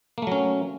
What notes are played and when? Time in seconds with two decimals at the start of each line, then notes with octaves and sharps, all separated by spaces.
0.18 A#3
0.22 A3
0.27 F#3
0.32 C#4